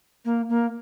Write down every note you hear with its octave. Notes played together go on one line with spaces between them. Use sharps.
A#3
A#3